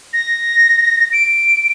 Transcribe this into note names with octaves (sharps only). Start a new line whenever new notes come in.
A#6
D7